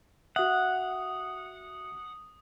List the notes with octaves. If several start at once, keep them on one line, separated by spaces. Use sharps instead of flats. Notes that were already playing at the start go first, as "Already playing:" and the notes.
F#4 E5 F#5 D#6